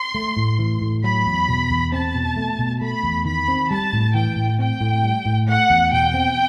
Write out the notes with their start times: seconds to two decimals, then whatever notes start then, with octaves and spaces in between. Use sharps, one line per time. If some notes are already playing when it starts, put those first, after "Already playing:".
Already playing: C6
0.15 A3
0.37 A2
0.59 E3
0.81 A2
1.04 F#3 B5
1.26 E2
1.48 B2
1.71 E2
1.92 C4 A5
2.15 B2
2.37 A3
2.59 B2
2.81 A3 B5
3.03 E2
3.25 D#3 B5
3.48 C4
3.70 G3 A5
3.93 A2
4.14 E3 G5
4.36 A2
4.59 C4 G5
4.81 A2
5.03 G3
5.26 A2
5.48 A3 F#5
5.70 E2
5.92 B2 G5
6.14 C4